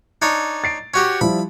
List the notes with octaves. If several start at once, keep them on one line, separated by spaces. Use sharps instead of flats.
D4 D#4 C#5
A6 C7 D7
C#4 F#4 G4
F3 G3 E4 B5